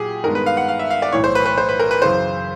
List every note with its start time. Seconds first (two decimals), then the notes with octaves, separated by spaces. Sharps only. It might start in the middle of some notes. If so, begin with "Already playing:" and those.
Already playing: A#2 F#3 G4 G#4
0.24 G2 D#3 G#3 B3 A#4
0.35 B4
0.46 F5
0.57 F#5
0.68 F5
0.79 E5
0.91 F5
1.02 D5
1.12 B1 A2 E3 C#5
1.24 C5
1.35 B4
1.46 B4
1.58 C5
1.69 B4
1.79 A#4
1.91 B4
2.02 F#2 C#3 E3 C5